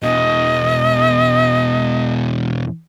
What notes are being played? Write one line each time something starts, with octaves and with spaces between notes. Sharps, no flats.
E2 B2 D#5